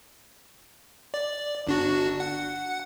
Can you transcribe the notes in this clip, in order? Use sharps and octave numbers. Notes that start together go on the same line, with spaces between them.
D5
G1 D4 F#4
F#5